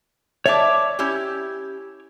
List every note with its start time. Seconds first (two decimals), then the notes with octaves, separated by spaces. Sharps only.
0.46 C#5 D5 E5 A5 D6
0.99 C#4 E4 G4